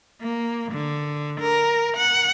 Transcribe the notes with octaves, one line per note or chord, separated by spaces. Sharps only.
A#3
D3
A#4
F#5